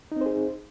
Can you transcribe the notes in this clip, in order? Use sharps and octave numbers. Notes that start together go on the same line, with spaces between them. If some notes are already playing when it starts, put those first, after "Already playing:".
C4 D#4 G#4 C5